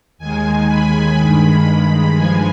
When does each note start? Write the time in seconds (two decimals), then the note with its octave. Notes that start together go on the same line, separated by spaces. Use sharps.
0.18 D#2 D#3 G#3 G#5
0.68 B5
1.17 G2 D#3 G#3
1.66 B5
2.15 G2 F3 G#3 G#5